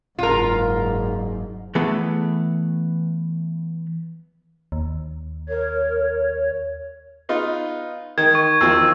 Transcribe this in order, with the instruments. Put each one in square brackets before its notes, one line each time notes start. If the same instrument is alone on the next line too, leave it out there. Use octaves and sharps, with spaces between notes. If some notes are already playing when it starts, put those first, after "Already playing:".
[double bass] F#1 G#2 [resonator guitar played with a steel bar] F4 A#4
[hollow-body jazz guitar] E3 A3 B3 G#4 A4
[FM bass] D#2
[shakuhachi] A#4 [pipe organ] C#5
[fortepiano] B3 D#4 F4
[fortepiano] D#3 [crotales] G#6
[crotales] C#6
[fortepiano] E2 D#3 F3 [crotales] E6